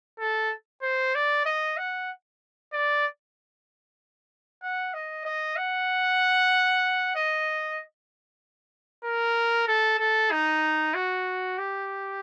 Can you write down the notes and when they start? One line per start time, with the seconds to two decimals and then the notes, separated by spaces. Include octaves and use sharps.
0.20 A4
0.82 C5
1.15 D5
1.46 D#5
1.77 F#5
2.73 D5
4.63 F#5
4.94 D#5
5.25 D#5
5.57 F#5
7.16 D#5
9.04 A#4
9.68 A4
9.99 A4
10.32 D#4
10.95 F#4
11.58 G4